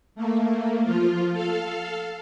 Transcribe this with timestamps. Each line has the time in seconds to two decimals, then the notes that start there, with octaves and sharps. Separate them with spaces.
0.15 A3 A#3
0.83 F3 F4
1.32 A4 F5